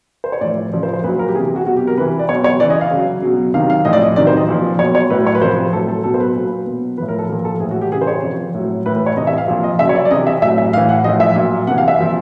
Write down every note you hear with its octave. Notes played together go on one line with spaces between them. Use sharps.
C5
C#5
A2 F3 D5
C#3 F3 D5
C5
C5
A#2 F#3 B4
A#4
G4
C3 E3 G#4
F#4
B2 F#3 F#4
G4
A#4
C3 E3 B4
D5
B2 F#3 C#5
C#5
C#3 E3 D5
D#5
F5
C#3 F#3
B2 F#3
C3 D#3 F#3 F5
F5
A2 F3 D#5
D5
D#5
C3 D#3 F#3 D5
C5
D#5
A#2 F3
B2 F#3 C#5
C#5
A2 F#3 B4
C#5
B4
C3 F3 C5
A2 F#3 A4
A4
B2 F#3 A4
C5
B4
A#2 F#3
B2 F#3
A2 F3 B4
A#4
A4
A#2 F3 A#4
A4
A2 E3 G#4
F#4
G4
C#3 E3 G#4
C5
C#5
C3 F3
A2 F#3
A2 E3 B4
B4
C#5
C3 E3 D#5
E5
F5
A#2 F3
D#5
C#3 F#3 E5
C#5
D5
D5
C3 E3 D#5
E5
A2 F#3 E5
E5
A2 E3 F5
F#5
A2 F3 D#5
E5
A#2 F#3
C3 E3 F#5
F5
E5
A#2 F3